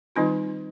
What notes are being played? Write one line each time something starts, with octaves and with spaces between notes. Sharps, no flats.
D#3 G3 C4 D#4 F4